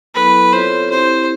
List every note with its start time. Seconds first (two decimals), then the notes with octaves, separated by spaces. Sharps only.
0.15 F#3 B3 E4 A4 B4
0.53 C4 F4 A4 C5 C#5 E5
0.91 C4 E4 G4 C5